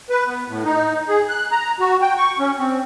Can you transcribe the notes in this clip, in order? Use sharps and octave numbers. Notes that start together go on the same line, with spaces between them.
B4
B3
A2
D#4
G#4
F#6
A#5
F#4
G5
C#6
C#4
C4